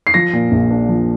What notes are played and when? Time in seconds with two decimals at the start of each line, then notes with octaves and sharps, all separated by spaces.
0.07 C7
0.14 F3 A#6
0.33 A#2
0.51 A#1
0.70 D4
0.89 F3